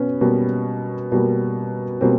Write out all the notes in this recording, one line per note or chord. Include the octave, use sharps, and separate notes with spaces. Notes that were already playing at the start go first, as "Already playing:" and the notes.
Already playing: B2 B3 C#4
B2 G3 A#3
B2 G3 A#3
B2 G3 A#3 C4